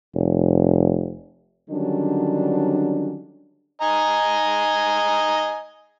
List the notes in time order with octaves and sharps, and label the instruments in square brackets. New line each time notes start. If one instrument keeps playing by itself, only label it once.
[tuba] F1
[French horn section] D3 D#3 F#3 G3 C#4 D4
[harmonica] D#5 G#5 A#5